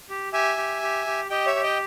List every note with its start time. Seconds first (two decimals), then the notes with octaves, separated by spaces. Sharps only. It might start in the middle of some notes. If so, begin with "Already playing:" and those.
0.10 G4
0.33 G4 E5 G#5
0.57 G4
0.82 G4
1.06 G4
1.30 G4 D#5 G5
1.46 C#5 E5
1.56 G4
1.63 D#5 G5